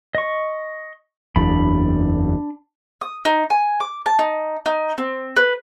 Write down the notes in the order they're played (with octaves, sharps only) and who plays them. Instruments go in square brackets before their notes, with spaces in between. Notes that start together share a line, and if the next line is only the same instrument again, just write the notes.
[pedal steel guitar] D#5 C#6
[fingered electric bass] F#1 E2 [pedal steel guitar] D4 B5
[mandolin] D#6
D#4
G#5
D6
A5
D#4
D#4
C4
B4